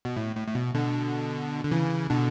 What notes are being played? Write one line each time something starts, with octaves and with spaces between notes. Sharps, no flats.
B2
A2
A2
A2
B2
B2 D3
D3
C#3 E3
B2 D3